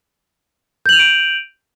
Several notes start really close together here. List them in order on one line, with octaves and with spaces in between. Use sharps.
G6 F#7 F7 D#7 D7